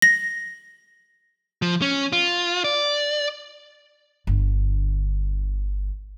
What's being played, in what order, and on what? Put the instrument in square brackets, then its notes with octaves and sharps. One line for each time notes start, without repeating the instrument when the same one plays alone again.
[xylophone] A#6
[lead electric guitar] F3
C#4
F4
D5
[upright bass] G1 D3